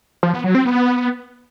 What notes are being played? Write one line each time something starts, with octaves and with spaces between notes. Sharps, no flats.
F3
B3
F#3
C4
B3